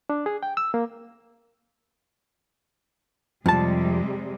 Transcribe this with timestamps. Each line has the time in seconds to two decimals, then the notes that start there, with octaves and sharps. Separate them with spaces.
0.10 D4
0.26 G#4
0.43 G5
0.57 E6
0.74 A#3
3.46 F2 C3 G3 G#3 A5